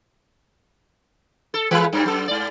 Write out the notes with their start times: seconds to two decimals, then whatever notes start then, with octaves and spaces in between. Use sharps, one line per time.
1.54 A4
1.71 E3 G#3 B4
1.93 G2 G3
2.06 F#2 A4
2.28 G#2 D5